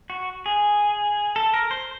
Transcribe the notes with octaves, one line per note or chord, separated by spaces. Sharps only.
F#4
G#4
A4
A#4
C5